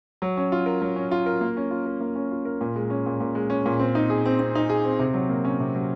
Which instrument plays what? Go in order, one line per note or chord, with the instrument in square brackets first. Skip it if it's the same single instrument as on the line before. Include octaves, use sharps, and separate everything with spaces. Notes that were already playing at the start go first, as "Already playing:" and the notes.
[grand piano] F#3
C#4
F4
A#4
F#3
C#4
F4
A#4
A#3
C#4
F4
A#4
A#3
C#4
F4
A#4
A#2
G#3
C#4
A#2
A#2
G#3
C#4
A#2
C4
D#4
G#4
C4
C4
D#4
G#4
C4
C3
F#3
A#3
C#4
C3
F#3